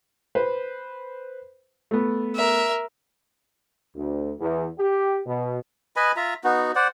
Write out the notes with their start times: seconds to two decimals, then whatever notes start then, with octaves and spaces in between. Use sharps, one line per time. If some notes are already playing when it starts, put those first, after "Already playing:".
0.35 B4 C5
1.91 A3 B3
2.37 A#4 E5
3.95 D2
4.40 E2
4.78 G4
5.26 B2
5.96 B4 D#5 G#5 B5
6.16 F4 E5 A#5
6.44 B3 D#4 F#4
6.75 C5 D5 F#5